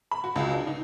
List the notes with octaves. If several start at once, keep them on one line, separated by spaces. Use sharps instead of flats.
B5
F#4
C#2
D4
D#4